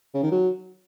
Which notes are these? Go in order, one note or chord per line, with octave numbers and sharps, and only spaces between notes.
C#3
D#3
F#3